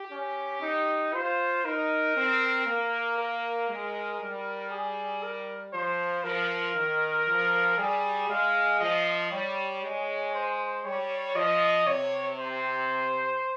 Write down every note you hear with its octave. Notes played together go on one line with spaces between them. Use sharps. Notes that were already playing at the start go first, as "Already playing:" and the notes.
Already playing: G4
C#4
D#4
F4 C5
D#4 A#4
C4
A#3
A#4
G#3
G3
G#4
A#4
F3 C5
F3 A#4
D#3
F3
G3 G#4
G#3 F5
F3 D#5
G3 C#5
G#3
C5
G3 C#5
F3 D#5
C3 C#5
C5